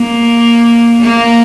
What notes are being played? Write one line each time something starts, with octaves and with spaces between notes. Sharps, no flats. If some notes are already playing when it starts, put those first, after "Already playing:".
Already playing: A#3
A#3